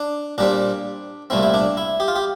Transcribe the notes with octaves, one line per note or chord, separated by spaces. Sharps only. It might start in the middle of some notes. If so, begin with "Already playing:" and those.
Already playing: D4
A#2 G3 C4 D4
C2 A#2 A3 C4 E4
E4
D4
E4
G4
F4
G4